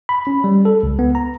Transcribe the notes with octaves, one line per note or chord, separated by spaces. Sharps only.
B5
C#4
G3
A4
C#2
B3
A#5